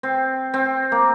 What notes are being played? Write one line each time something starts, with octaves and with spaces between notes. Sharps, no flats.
C4
C4
A#3